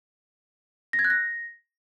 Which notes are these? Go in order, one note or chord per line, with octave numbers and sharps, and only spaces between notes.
A#6
G#6
F#6
A#6